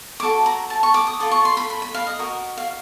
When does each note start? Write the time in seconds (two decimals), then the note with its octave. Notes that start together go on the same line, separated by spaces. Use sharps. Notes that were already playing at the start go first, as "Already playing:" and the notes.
0.20 C#5 D6
0.23 F#4 A4
0.46 A#5
0.70 A5
0.83 C#6
0.94 D6
1.07 D#6
1.20 F4 A4 D6
1.31 C#6
1.45 C6
1.57 B5
1.70 B5
1.82 B5
1.95 F5
2.07 D#5
2.19 F#4 A#4 D#5
2.57 F5